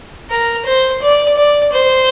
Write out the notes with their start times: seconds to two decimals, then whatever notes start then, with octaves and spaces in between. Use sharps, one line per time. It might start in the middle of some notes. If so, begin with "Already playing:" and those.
0.30 A#4
0.66 C5
1.02 D5
1.37 D5
1.73 C5